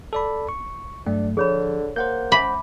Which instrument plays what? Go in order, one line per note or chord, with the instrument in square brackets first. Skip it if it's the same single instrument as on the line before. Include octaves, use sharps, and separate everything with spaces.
[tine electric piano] A4 D5 B5
C#6
[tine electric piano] G2 F#3 A3 [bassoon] D4 [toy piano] G5
[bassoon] D3 [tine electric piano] F3 [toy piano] G#4 C#5 B5
[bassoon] A#3 [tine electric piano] C5 F#5 G6
[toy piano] E5 G#5 D6 [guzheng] B5